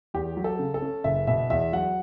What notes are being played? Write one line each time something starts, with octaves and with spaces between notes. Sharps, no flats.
E2 G4
F#3
A4
C#3
A4
C#4
F#1 E5
B2 E5
E2 E5
F#3 F#5